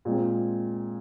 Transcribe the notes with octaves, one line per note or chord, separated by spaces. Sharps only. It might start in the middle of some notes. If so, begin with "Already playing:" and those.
A#2 G#3 C4